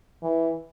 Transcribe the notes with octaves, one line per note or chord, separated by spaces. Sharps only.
E3